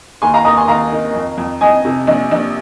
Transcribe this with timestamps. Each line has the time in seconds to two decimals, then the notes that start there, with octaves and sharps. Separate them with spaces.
0.22 D#2 G#5 C6
0.34 F5 A#5
0.45 D#2 A#5 D#6
0.57 G#5 C6
0.68 D#2 F5 A#5
0.92 D#3
1.15 F2
1.38 F2
1.61 F2 D#5 G#5
1.85 C3
2.07 A#1
2.31 A#1